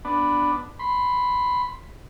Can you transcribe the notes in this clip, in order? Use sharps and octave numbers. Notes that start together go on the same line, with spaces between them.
B3 D4
B5 C6